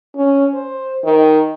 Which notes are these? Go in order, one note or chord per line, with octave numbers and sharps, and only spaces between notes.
C#4
C5
D#3